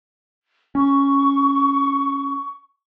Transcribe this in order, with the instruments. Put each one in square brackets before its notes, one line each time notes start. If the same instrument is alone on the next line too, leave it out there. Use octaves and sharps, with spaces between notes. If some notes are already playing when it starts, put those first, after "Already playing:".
[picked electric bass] C#4 [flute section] C#6